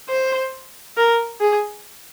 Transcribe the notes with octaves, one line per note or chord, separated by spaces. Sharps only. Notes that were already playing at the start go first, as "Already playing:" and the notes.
C5
A#4
G#4